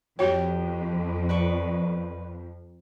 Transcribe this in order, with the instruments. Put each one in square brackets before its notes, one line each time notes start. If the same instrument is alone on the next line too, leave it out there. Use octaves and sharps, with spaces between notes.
[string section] F2 [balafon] F#4 C#5 [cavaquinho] G4
[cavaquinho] B4 D5 C#6